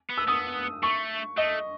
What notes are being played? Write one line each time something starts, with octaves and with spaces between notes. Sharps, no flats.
B3
E6
B3 D#6
A3 C#6
A3 D#5